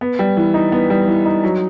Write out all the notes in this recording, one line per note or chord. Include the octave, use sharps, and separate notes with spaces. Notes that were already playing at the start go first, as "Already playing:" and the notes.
B3
G3
E3
D#4
B3
G3
E3
D#4
F#3